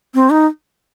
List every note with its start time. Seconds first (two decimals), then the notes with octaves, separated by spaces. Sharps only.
0.14 C4
0.30 D#4